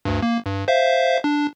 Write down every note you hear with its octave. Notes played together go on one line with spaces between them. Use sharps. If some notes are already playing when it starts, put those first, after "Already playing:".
D2 G2
A#3
G2
C5 E5 F5
D4